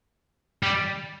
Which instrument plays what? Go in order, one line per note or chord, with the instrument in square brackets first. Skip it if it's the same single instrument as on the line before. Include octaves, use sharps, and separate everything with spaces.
[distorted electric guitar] G3